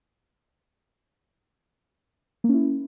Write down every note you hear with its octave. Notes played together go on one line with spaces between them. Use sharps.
A#3
C#4
E4